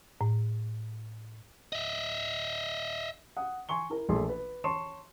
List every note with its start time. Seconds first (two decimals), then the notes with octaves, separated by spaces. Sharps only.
0.21 A2
1.73 D#5 E5
3.37 F#5 D#6
3.69 G#5 C6 C#6 G7
3.90 E4 A#4
4.09 A#1 A3 A#3 C6
4.29 B4
4.64 C#5 A5 C6 C#6 E7